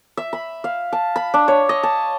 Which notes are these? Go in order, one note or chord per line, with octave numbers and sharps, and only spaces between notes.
E5
B5
F5
A5
B5
D4
C#5
D#5
A5